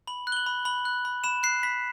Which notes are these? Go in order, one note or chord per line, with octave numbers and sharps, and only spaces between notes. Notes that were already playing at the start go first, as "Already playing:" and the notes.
B5 F#7
F#6
G7
F#7
B5
B5 F#7
F#6
B5
B5 E7
F#6 C7
B5 B6